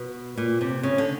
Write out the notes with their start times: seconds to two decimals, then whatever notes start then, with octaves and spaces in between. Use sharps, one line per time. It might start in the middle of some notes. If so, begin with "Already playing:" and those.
Already playing: B2
0.37 A#2
0.61 C3
0.83 C#3
0.98 D3